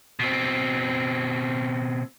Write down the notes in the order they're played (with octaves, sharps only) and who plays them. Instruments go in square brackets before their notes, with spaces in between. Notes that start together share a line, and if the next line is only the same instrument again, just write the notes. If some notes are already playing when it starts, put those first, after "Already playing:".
[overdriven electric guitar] B2 C4